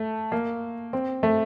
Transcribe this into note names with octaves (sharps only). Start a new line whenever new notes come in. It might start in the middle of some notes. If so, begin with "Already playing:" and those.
Already playing: A3
A#3
C4
A3